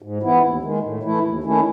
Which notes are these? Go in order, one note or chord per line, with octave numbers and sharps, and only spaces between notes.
G#2
E3 B3 E4
D#2
D#3 G#3
A2
E3 A3 E4
D#2
D#3 A3 C#4 E4